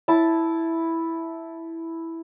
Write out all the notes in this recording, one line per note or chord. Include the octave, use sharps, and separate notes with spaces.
E4 A5